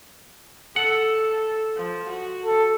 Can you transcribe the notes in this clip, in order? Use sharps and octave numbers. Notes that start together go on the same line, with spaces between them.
A4 F#5
F3
F#4
A4